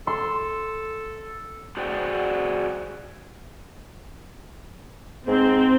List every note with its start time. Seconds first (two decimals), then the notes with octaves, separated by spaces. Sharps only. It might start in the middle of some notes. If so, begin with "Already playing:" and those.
0.07 A4 C6
1.77 F#4 G#4 C5 D5 F#5 G5
5.28 G#2 C4